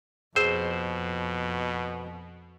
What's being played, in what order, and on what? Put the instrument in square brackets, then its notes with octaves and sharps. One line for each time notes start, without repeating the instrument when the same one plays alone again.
[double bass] F2 [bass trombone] B2 [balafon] G#4 [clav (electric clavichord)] C5